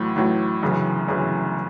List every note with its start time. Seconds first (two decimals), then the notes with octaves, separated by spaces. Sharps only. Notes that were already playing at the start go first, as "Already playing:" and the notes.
Already playing: A1 A2 F#3
0.16 A1 A2 F#3
0.63 G1 F#2 C#3 E3
1.08 G1 F#2 C#3 E3